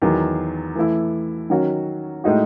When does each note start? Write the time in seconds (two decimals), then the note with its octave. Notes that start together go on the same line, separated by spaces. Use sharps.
0.02 E2 D#3 F#3
0.75 E3 A3 E4
1.50 D#3 F#3 C#4 F#4
2.24 A2 G#3 D#4 F#4